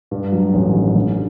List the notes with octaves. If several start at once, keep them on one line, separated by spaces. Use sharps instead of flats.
G2
F#3
A1
D#3
D3